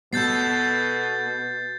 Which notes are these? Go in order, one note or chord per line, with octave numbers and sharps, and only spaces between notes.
B2 B3 A4 G6 A6 C7